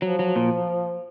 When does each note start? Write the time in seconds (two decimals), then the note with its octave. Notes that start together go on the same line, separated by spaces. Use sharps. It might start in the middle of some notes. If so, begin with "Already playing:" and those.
0.01 F3 F#3
0.19 F#3
0.36 A#2